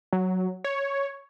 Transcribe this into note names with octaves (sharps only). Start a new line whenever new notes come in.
F#3
C#5